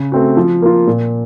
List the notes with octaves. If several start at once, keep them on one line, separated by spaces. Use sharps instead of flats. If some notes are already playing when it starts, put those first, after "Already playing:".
Already playing: C#3
A3 C4 F#4
F3
A#3 F4
A#2